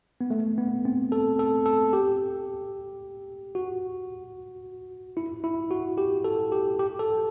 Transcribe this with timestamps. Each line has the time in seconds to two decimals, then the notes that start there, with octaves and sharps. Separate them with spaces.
0.21 B3
0.30 A3
0.58 B3
0.85 C4
1.12 A4
1.39 A4
1.66 A4
1.93 G4
3.55 F#4
5.17 E4
5.44 E4
5.71 F#4
5.98 G4
6.24 A4
6.52 G4
6.79 G4
6.99 A4